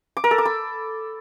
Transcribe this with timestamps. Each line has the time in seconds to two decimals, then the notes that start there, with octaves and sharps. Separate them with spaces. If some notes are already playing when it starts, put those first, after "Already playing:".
0.17 D6
0.24 A#4
0.31 A4
0.38 D6
0.45 B5